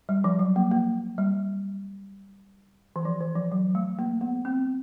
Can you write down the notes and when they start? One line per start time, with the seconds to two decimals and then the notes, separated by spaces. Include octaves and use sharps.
0.09 G3
0.24 F3
0.39 F#3
0.56 A#3
0.71 A#3
1.18 G3
2.96 E3
3.05 F3
3.21 E3
3.36 F3
3.52 F#3
3.75 A3
3.99 A#3
4.21 B3
4.45 C4